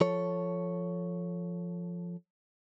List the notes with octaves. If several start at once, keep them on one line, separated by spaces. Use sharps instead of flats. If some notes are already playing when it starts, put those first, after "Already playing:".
F3 A4 C#5